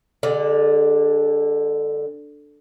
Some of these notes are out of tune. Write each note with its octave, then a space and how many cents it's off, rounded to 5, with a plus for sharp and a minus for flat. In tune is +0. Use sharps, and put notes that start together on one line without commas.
D3 +0 G#3 -40 D5 +0